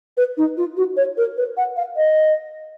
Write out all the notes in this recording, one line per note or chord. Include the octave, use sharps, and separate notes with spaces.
B4
D#4
F4
F#4
C#5
A#4
B4
F#5
F5
D#5